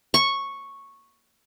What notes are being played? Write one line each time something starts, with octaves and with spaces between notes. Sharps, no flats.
C#6